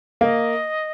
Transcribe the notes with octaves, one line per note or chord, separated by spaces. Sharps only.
A#3 D#5